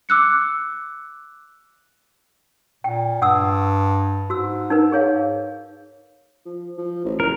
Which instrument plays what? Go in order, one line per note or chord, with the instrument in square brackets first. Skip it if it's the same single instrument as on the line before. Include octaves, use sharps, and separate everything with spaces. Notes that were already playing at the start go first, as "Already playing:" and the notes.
[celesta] D6 E6 F#6 C#7
[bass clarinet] A#2 [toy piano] G5
[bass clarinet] G2 [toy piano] F#5 D#6 E6
[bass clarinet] G#2 [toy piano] F#4 E6
[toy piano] D#4 A#4 B4
G#4 C#5 F5
[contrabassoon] F3
F3
A1
[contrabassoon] F#1 [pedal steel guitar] A#4